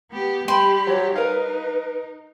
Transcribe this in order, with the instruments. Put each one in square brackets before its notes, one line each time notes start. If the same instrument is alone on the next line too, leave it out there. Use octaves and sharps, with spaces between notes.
[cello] B3 G4
[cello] G3 G4 [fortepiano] G5 [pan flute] B5 [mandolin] C6
[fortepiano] F#3 [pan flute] C#5
[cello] D#4 [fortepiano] A#4 F5 [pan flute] B4